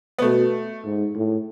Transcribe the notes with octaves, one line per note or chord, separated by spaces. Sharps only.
B3
B2 A3
G#2
A2